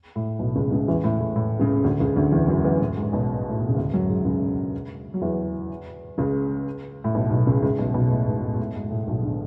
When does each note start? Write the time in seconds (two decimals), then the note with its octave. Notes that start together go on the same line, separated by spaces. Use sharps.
0.16 A2
0.39 B1 B2
0.55 C#2 C#3
0.71 C#2 C#3
0.88 E2 E3
1.04 A2
1.20 A2
1.36 A2
1.60 C#2 C#3
1.84 D2 D3
2.00 C#2 C#3
2.16 D2 D3
2.32 E2 E3
2.48 F#2 F#3
2.64 E2 E3
2.80 A2
2.97 G#2
3.12 B1 B2
3.49 A2
3.59 B2
3.69 C#3
3.76 D2 D3
3.94 F#2 F#3
4.09 G#2 G#3
4.25 C#2 C#3
5.14 F#3
5.22 E2 E3
6.18 C#2 C#3
7.04 A2
7.15 B1 B2
7.30 B1 B2
7.47 C#2 C#3
7.62 C#2 C#3
7.78 B1 B2
7.94 B1 B2
8.11 A2
8.26 G#2
8.43 A2
8.54 G#2
8.59 A2
8.76 G#2
8.91 A2
9.07 B1 B2
9.23 D3